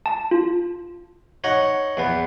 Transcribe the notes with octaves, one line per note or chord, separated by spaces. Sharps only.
A5
F4
D#4 C#5 F#5
E2 B3